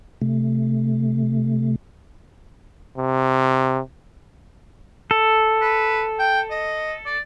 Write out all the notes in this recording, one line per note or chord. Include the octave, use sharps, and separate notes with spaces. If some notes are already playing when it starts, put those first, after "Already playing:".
C3 A3
C3
A4
B4
G5
D#5
D5